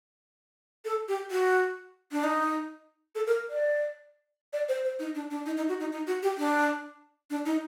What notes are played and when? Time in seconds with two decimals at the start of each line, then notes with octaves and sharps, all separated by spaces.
0.85 A4
1.08 G4
1.31 F#4
2.12 D4
2.24 D#4
3.15 A4
3.27 A#4
3.50 D5
4.53 D5
4.69 C5
4.84 C5
4.99 D#4
5.15 D4
5.30 D4
5.46 D#4
5.57 D#4
5.69 F#4
5.80 D#4
5.92 D#4
6.07 F#4
6.23 G4
6.38 D4
7.30 D4
7.45 D#4